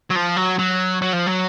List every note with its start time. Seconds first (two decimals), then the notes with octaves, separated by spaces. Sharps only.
0.10 F#3
0.15 F3
0.36 F#3
0.59 F#3
1.02 F#3
1.13 F3
1.26 F#3